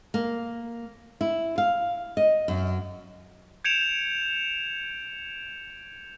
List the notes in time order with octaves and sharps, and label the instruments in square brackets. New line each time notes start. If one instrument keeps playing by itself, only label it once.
[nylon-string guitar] A#3
E4
F5
D#5
F#2
[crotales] G6 G#6 C#7 D7 E7 F7